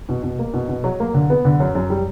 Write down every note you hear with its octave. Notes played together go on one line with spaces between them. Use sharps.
B2
B2
A#3
B2
B2
F#3
A#3
D3
B3
D3
F#2
F#2
G3